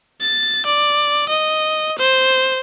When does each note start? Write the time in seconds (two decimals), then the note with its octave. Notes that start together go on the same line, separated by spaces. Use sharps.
0.21 A6
0.66 D5
1.28 D#5
1.98 C5